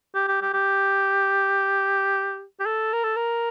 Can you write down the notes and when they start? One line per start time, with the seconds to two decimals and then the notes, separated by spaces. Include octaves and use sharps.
0.15 G4
0.28 G4
0.42 G4
0.54 G4
2.60 G4
2.66 A4
2.93 A#4
3.04 A4
3.16 A#4